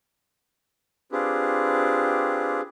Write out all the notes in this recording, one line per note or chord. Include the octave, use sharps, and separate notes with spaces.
C4 D4 F4 G4 G#4 B4